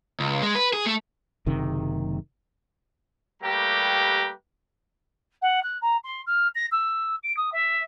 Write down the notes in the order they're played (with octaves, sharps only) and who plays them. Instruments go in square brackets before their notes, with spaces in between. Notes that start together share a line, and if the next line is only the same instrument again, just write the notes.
[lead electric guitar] C#2
G#3
B4
G#4
A3
[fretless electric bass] F#1 C3 D#3
[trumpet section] G3 A3 A#3 G4 B4 A#5
[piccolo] F#5
F#6
A#5
C6
F6
A#6
E6
D7
D#6
E5